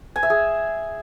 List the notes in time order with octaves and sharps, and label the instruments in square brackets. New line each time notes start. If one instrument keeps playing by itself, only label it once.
[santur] G#5
E5
G#4